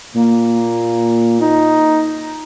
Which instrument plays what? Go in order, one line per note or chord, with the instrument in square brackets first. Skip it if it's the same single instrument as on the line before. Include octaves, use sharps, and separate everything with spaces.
[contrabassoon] A#2 [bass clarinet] A#3
[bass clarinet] D#4